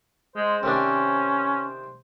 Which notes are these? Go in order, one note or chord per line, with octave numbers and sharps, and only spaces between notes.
G#3 C5
C3 D#3 C#4 D4